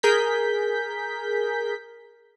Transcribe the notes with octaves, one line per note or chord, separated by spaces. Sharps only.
G#4 A#4 G6 B6